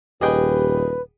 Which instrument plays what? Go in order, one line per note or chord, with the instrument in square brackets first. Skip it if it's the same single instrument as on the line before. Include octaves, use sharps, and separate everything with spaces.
[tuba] D#1 [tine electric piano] G4 [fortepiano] G#4 D#5 G5 [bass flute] B4